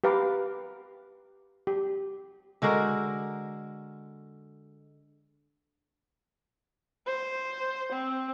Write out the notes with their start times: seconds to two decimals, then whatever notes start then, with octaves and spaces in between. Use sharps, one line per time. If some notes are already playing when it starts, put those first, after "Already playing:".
0.04 G4 B4 F5 A#5 D6
1.67 G4
2.62 D3 G#3 F#4 A#4
7.07 C5
7.92 C4